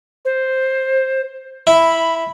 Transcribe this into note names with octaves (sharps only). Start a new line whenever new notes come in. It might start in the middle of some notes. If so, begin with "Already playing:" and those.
C5
E4 B5